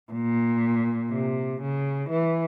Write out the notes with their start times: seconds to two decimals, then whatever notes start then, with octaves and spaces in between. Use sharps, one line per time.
0.13 A#2
1.12 C3
1.62 C#3
2.10 E3